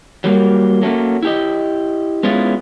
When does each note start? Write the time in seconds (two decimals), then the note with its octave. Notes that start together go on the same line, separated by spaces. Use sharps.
0.24 F#3 G3 A#3
0.82 F#3 A3 A#3 C#4
1.23 E4 G4 D#5
2.23 G#3 B3 C#4 E4 F4